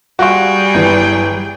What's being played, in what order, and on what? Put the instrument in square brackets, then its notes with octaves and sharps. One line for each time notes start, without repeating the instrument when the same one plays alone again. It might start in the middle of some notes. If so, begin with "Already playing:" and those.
[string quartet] G3 G#4 G5 [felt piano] F#4 F5 C#6
[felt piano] G1 E3